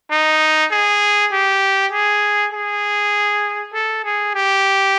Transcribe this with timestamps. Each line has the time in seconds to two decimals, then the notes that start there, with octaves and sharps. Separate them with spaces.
0.11 D#4
0.71 G#4
1.32 G4
1.92 G#4
2.53 G#4
3.74 A4
4.05 G#4
4.35 G4